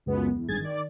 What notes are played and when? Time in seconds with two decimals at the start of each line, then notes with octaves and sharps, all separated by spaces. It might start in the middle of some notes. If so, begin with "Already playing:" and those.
0.06 C#2 F#2 G#3 B3
0.36 E2
0.48 G#1 G2 G#4 G#6 A6
0.60 D#3 D5